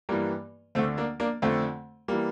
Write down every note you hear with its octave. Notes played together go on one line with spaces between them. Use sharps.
G2 E3 G3 A#3
D2 D3 A3 C4
A#3 D4
A#3 D4
F2 D3 A3 C4
E3 G3 A#3